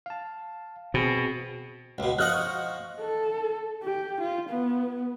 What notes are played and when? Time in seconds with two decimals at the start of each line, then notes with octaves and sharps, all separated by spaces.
0.06 F5 A5
0.94 B2 C4 F#4 G#4
1.98 C#2 B2
2.18 F3 D#5 F#5 D#6 F6 F#6
2.33 C#6
3.01 A4
3.83 G4
4.21 F4
4.50 B3